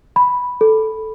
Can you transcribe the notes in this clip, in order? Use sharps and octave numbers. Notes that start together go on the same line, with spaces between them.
B5
A4